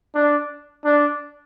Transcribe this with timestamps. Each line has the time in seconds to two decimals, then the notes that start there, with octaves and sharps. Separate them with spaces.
0.15 D4
0.85 D4